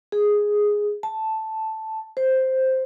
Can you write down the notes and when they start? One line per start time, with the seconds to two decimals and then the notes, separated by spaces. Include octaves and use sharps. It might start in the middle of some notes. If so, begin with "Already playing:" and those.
0.12 G#4
1.03 A5
2.17 C5